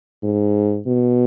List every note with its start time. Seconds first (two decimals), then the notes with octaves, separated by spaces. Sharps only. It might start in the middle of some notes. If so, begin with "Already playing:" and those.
0.23 G#2
0.86 B2